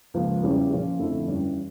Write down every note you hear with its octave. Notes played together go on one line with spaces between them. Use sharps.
C#2 C#3 F3 A#3
E2 C#3 G3 C#4
A#2 F3 C#4 F4
F2 D3 A3 E4
G2 E3 G3 C#4